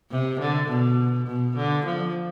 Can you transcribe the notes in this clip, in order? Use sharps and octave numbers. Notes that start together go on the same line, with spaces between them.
C3
D3
B2
B2
D3
F3